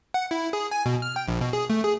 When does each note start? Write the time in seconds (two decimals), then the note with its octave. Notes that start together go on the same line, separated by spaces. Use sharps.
0.14 F#5
0.31 E4
0.53 G#4
0.71 G#5
0.86 B2
1.02 F6
1.16 G5
1.28 A#1
1.41 B2
1.53 G#4
1.70 A3
1.85 G#4